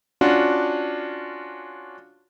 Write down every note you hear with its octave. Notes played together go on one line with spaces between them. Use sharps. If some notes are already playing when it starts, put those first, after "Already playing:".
C#4 D4 F4 F#4